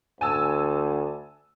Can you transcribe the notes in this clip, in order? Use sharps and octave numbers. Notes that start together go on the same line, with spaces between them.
D2 G#5 A5 E6